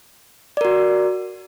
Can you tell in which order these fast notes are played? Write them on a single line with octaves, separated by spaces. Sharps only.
D5 A#4 F#4